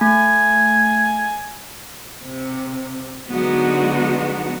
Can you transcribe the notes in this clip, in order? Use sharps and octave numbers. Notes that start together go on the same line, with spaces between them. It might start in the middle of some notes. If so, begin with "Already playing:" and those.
A3 G#5
C3
D3 F#3 G#3 B3 D#4 F#4